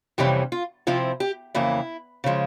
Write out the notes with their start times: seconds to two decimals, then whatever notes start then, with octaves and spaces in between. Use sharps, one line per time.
0.18 F2 C3 E3 G3 C#4 G4
0.52 F4
0.87 C3 F3 C4 E4 F4
1.20 G4
1.55 F2 C#3 E3 A#3 E4
2.24 C#3 F3 G#3